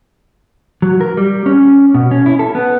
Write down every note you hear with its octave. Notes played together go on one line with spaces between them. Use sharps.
F#3
A#4
G3
C#4
B2
C#4
E4
A4
B3